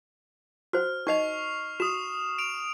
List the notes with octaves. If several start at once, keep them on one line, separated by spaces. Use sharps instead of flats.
F#4 C5 F6
D#4 D#5 C#6 C7 F7
F#4 D#6 E7
D7 F7